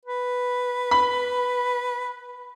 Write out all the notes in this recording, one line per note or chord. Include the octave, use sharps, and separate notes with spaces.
B4
B5